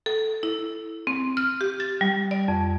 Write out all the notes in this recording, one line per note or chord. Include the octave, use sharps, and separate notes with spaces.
A4
E4
C4
F6
G4
A6
G3
D5
F2